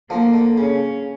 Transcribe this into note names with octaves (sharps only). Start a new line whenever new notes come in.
D3 F3 A#3
D3
C#3 C#4